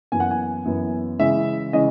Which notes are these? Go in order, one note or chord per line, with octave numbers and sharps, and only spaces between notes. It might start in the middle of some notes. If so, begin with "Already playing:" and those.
F#2 E3 B3 G#5
F#5
G#5
F#2 E3 B3
C#3 E3 G#3 C#4 E5
C#3 E3 G#3 C#4 D#5